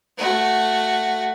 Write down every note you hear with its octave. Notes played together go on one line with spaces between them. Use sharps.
A3 F#4